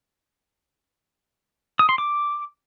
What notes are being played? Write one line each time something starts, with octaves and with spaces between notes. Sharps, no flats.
D#6
C6
D6